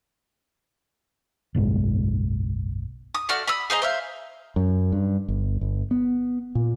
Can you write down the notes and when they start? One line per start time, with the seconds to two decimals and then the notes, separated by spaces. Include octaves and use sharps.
1.55 F#1 B1 G#2 G#3
3.15 D#6
3.29 A3 F#4 D5 F6
3.48 B5 D#6 E6
3.70 G#4 C5 D#5 A#5
3.82 C5 E5 F5
4.56 F#2
4.92 G2
5.28 G1
5.61 G1
5.91 B3
6.55 A#2